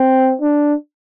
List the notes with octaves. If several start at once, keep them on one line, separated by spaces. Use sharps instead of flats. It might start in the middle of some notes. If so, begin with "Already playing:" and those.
Already playing: C4
D4